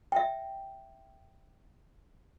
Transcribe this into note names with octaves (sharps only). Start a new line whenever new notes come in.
E5 G5